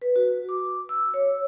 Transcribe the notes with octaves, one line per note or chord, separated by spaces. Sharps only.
B4
F#4
D6
E6
C#5